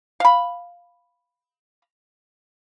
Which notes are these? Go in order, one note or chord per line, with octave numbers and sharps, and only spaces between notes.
F5 B5